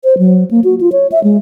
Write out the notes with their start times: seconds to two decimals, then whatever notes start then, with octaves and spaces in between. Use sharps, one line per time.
0.04 C5
0.18 F#3
0.51 A#3
0.64 F#4
0.81 F4
0.92 C#5
1.12 E5
1.24 G#3